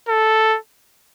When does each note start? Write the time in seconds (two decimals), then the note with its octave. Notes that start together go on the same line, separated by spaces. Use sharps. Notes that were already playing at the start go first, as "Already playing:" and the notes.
0.08 A4